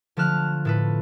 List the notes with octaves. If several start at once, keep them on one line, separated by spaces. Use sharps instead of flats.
D3 F3 A3 A5 F6 F#6
A2 A4 B4